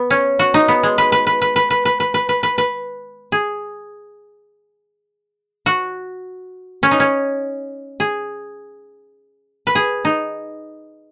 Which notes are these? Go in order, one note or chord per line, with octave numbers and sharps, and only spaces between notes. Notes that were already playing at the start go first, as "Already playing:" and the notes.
Already playing: B3
C#4
F#4
D#4
B3
G#3
B4
B4
B4
B4
B4
B4
B4
B4
B4
B4
B4
B4
G#4
F#4
C#4
D#4
C#4
G#4
B4
G#4
D#4